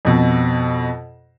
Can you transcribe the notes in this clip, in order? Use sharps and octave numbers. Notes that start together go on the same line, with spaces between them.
F2 B2